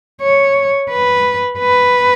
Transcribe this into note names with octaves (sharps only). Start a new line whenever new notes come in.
C#5
B4
B4